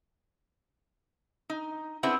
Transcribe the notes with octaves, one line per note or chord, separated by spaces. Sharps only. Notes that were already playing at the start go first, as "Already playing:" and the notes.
D#4
B3 C4 D4 E4 G#4 C5